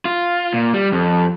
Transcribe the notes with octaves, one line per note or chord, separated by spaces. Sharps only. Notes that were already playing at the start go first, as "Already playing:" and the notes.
F4
A#2
G3
F2